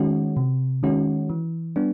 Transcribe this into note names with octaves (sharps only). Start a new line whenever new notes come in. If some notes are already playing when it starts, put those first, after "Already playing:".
Already playing: D#3 G#3 C#4 F#4
C3
D#3 G#3 C#4 F#4
E3
G3 B3 D4